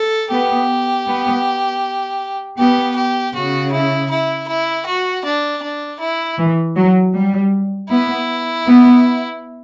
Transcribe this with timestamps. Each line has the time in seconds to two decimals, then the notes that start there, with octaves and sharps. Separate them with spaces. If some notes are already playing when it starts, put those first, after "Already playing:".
Already playing: A4
0.31 B3 G4
1.06 B3
2.58 B3 G4
2.96 G4
3.35 C#3 F#4
3.72 E4
4.10 E4
4.48 E4
4.86 F#4
5.25 D4
5.62 D4
6.00 E4
6.38 E3
6.76 F#3
7.15 G3
7.90 B3 E4
8.65 B3